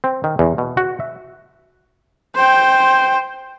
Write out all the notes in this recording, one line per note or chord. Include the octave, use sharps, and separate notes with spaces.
C4
D#3
E2
B2
F#4
E5
C5 G5